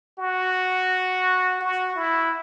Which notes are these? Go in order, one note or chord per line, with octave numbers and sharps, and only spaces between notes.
F#4
F#4
E4